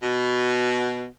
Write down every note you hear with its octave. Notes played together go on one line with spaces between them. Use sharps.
B2